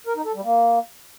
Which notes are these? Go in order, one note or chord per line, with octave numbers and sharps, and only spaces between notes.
A#4
D#4
A4
G3
A#3